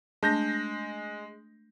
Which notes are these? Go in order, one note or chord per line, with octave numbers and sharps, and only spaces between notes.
G#3 A3 D4 A5 G6 A#6